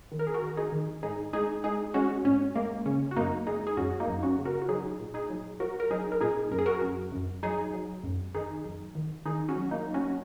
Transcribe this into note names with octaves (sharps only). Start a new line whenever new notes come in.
D#3
A#4
G#4
F#4 A#4
D#3
D#4 G#4
D#3
G#2 D#4 G#4
G#3 D#4 G#4
G#3 D#4 G#4
G#3 C#4 F#4
G#2 C#4
G#3 A#3
C#3 C#4
F#4
F#2 A#3 D#4
G#3 D#4 G#4
G#4
F#2 C#4 F#4
A#3 D#4
F#2
C#4 F#4
C#3
F#4 A#4
F#4
F#3 D#4 G#4
A#2
D#4 G#4
F#3
F#3 F#4 A#4
A#4
F#3 D#4 G#4
A#4
A#2 D#4 G#4
F#2 A#4
G#4
F#4 A#4
F#2
F#2
F#3 D#4 G#4
F#3
F#2
D#3 D#4 G#4
F#2
D#3
D#3 D#4 G#4
C#4 F#4
F#3
A#3 D#4
F#3
C#4 F#4